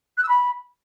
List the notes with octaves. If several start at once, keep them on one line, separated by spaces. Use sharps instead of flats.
F#6
E6
B5